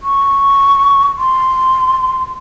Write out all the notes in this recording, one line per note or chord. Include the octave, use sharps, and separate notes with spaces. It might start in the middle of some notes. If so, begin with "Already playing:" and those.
C#6
C6